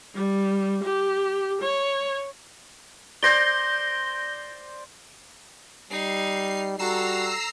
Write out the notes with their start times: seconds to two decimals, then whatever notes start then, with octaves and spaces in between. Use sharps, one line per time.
0.15 G3
0.84 G4
1.62 C#5
3.23 C5 D5 G6 A#6 G7
5.91 G3 D#4 C7
6.79 G3 F#4 A4 A#5 E6 C7